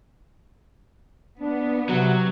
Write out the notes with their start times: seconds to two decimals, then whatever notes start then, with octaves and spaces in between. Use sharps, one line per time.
1.39 B3 D4
1.89 C3 F#3